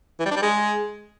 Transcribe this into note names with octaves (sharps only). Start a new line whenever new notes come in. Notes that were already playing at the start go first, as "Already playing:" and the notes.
E3
G3
D4
G3
G#3